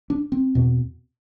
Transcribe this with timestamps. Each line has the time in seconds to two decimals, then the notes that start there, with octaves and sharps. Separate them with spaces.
0.10 D4
0.32 C4
0.55 E2 B2